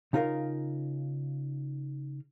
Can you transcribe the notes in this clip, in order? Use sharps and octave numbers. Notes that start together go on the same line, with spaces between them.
C#3 D#4 F4 G#4 A#4 F5